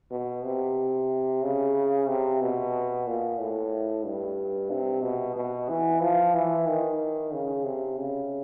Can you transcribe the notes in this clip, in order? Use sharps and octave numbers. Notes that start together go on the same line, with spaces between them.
B2
C3
C#3
C3
B2
A#2
A2
G2
C3
B2
B2
E3
F3
E3
D#3
C#3
C3
C#3